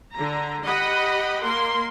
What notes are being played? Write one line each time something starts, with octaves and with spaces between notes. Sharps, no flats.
D3 A#5
G4 D#5 F#5 B5
A#3 A#4 C6